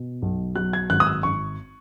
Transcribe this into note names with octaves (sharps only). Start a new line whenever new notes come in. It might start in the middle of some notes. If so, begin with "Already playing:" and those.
Already playing: B2
B1
F#3 F#6
G#6
G#1 F#6
D#6
E6
G#1 C#6